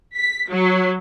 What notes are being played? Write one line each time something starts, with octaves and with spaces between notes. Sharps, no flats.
B6
F#3